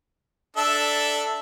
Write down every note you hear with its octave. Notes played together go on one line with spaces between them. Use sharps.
D4 A4 E5